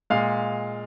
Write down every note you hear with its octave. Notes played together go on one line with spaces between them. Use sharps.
A#2 G#3 F5